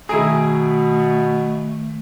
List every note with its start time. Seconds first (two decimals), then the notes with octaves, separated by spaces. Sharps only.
0.09 B2 D#3 A3 E4 G#4 G5 A#5